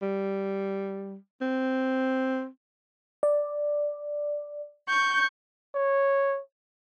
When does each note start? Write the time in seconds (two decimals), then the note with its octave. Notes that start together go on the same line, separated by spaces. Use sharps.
0.02 G3
1.41 C4
3.23 D5
4.88 C#6 G6
5.75 C#5